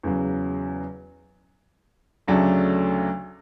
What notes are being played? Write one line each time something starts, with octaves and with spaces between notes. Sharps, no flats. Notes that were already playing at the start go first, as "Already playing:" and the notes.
E2 C#3 F#3
D2 C#3 F#3 A3 D4